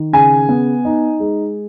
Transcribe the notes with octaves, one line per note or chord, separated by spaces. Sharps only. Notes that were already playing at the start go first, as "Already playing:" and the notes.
Already playing: D#3
C#3 G#5
B3
D#4
G#3